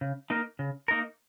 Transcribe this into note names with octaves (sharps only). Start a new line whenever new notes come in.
C#3
A#3 D#4 A#4
C#3
A#3 D#4 A#4